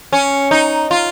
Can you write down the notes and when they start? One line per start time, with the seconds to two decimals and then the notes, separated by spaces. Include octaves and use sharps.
0.13 C#4
0.51 D#4
0.91 F4